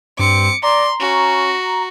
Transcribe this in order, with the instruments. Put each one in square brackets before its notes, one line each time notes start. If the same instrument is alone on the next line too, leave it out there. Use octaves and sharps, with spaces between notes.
[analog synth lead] G2 [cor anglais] C4 [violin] D6 C#7
[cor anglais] D5 [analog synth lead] A#5 [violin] C6
[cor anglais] C#4 [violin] F#4